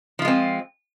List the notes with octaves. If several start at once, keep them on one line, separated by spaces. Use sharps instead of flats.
F3 G#3 C4 F4